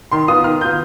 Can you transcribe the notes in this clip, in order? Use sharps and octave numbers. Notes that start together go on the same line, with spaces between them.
D#3 C6
B3 F4 D#6
D#3 F6
B3 F4 G6